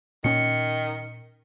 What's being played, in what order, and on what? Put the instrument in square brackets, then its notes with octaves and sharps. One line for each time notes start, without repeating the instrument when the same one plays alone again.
[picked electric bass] A#2 C#4 [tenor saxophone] D#3 [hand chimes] C#7